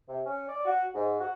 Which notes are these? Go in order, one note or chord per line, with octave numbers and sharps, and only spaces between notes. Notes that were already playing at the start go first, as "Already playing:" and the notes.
C3
C#4
D5
F#4
G#2
F#4